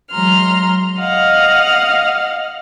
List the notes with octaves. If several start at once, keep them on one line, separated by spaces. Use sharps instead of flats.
E3 F#3 G#3 A#5 C6 F6
D#5 F5 F#5 F6